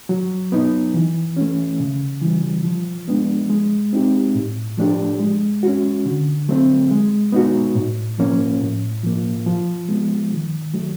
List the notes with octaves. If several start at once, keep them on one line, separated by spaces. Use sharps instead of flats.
F#3
B3 D#4
E3
A3 C#4
C#3
E3 G3
F3
G#3 B3 D4
G#3
C4 D#4 G4
A2
F3 A3 D4 G4
G#3
C#4 F#4
D3
F#3 A3 C4
G#3
B3 D#4 F#4
A2
F3 A#3 C#4
A2
F3 A#3
F3
G#3 B3
D#3
F#3 A3